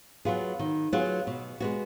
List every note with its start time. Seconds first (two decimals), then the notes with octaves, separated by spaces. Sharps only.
0.25 F#3 B3 F4 G#4
0.59 D#3
0.93 F#3 B3 F4 G#4
1.27 B2
1.60 G#3 B3 F#4